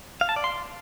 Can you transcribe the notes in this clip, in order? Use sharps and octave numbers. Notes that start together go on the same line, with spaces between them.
F5
A5
D5
C6